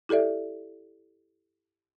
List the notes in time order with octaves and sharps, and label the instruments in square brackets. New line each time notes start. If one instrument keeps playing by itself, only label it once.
[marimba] E4 G4 A4 D5 E5